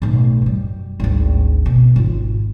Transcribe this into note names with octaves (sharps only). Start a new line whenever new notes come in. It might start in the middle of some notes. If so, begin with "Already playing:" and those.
B1 A2
F#2 G3
G#1 D2
B2
G#1 F4